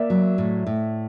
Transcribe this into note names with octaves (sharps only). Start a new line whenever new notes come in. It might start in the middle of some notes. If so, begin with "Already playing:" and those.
Already playing: A#3 D5 E5
F#3
A2
A2